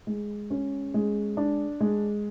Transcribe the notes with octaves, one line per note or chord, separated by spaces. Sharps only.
G#3
C#4
G#3
D4
G#3